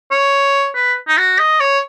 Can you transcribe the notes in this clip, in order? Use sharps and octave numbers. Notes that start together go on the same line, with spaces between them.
C#5
B4
D#4
F#4
D#5
C#5